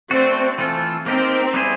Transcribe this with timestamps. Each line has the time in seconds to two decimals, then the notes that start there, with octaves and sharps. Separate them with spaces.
0.11 A3 C4 D4 F#4
0.58 E3 A3 C4 F4 A4
1.06 A#3 C4 D#4 G4 A#4
1.54 G3 B3 E4 G#4 C5